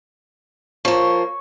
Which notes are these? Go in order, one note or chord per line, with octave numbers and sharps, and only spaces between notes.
F3 A#3 C#5